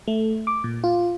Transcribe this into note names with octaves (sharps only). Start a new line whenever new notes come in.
A3
D6
A#2
F4